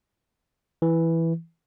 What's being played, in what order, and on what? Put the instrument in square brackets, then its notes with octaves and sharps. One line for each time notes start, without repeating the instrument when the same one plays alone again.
[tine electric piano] E3